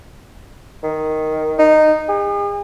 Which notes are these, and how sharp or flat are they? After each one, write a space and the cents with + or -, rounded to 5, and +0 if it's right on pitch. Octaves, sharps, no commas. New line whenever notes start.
D#3 +0
D#4 -15
G#4 -45